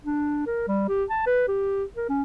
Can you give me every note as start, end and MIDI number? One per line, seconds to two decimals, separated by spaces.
0.05 0.44 62
0.46 0.67 70
0.68 0.83 55
0.88 1.04 67
1.10 1.26 81
1.26 1.45 71
1.48 1.84 67
1.97 2.09 70
2.09 2.23 61